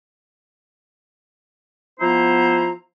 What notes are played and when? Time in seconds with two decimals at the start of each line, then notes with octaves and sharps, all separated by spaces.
2.00 F3 B3 E4 C5 A#5